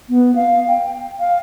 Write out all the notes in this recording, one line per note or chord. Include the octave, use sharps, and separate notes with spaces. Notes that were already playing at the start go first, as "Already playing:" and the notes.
B3
F5
G5
F5